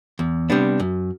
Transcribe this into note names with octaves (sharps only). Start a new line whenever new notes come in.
E2
C3 G3 B3 D4
F#2